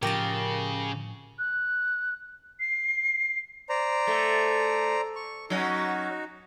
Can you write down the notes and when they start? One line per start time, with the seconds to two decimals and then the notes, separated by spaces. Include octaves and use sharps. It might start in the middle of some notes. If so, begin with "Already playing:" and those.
0.03 A2 C#3 F3 C#4 G4 A#4 A5 A#6
1.39 F#6
2.60 C7
3.69 C5 D5 A#5
4.07 A3
5.16 C#6
5.50 F#3 C#4 D#4 F#4